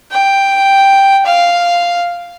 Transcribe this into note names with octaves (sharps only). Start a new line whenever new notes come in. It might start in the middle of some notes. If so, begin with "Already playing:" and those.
G5
F5